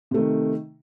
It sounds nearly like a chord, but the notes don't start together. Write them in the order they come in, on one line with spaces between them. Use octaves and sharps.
C3 A3 D#3